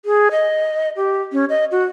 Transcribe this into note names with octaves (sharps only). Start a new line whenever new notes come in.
G#4
D#5
G4
C#4
D#5
F#4